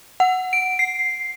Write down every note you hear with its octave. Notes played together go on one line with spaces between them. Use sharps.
F#5
D7
C7